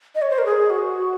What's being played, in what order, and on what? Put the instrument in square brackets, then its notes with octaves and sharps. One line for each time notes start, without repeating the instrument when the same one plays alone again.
[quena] D#5
C#5
C5
A#4
G#4
F#4